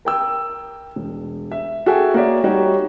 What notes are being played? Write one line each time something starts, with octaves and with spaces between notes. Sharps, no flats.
A#4 G5 E6
E1
E5
F#4 G#4 A4 E5 G5 G#5
A#3 F#4 C#5 D5 E5
G3 D#4 F#4 G4 C#5